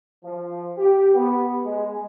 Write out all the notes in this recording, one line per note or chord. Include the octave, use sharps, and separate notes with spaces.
F3
G4
B3
G#3